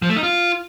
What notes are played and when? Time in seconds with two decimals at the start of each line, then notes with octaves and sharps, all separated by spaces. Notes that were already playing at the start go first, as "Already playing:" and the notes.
0.02 F3
0.09 A3
0.16 D#4
0.23 F4